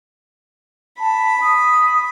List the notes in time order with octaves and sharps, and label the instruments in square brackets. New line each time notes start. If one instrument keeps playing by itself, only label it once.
[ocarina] A5 [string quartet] B5
[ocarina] D#6